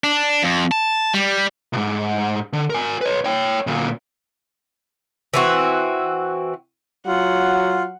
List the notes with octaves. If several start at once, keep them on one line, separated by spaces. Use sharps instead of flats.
D4
F2
A5
G3
B1 G#2
D3
A#4 G#5
B4 C#5
C#5 G5
D2 A#2
E3 C4 F#4
F#3 F4 F#5